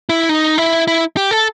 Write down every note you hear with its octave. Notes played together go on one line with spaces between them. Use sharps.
E4
D#4
E4
E4
G4
A4